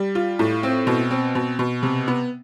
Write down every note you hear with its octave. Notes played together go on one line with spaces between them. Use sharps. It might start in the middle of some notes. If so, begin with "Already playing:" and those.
Already playing: G3
F4
A2
C4
B2
C4
B2
B2
C3
B3